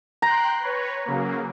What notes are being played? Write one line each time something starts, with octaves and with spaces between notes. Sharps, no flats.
G5 A#5 C6 F#6
B4 C#5
C#3 F#3 A#3